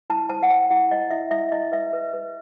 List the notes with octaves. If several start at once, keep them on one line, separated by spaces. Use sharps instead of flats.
E4 A5
C5 A5
F#5
C5 G5
E4 F#5
C5 D#5
E4 E5
E4 E5
E4 D#5
B4 E5
B4
B4